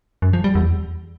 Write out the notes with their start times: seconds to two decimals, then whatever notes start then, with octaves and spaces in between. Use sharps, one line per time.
0.22 F#2
0.33 F3
0.44 G3
0.55 E2